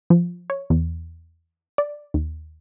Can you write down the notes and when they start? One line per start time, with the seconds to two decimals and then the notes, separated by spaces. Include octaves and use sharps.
0.10 F3
0.50 C#5
0.70 E2
1.78 D5
2.14 D#2